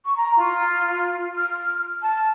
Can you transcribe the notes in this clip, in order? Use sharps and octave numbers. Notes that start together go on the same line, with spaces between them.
C#6
A#5
F4
F6
A5